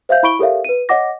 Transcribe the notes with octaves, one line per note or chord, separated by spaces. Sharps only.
C5 E5 F5 G6
E4 B5 C#6 D7 G7
G4 A4 A#4 C#5 E5 F5
B4 D#7
C#5 D#5 F#5 D6 A#6